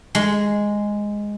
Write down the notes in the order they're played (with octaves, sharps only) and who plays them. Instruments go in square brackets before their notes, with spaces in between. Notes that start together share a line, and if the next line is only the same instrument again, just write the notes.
[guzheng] G#3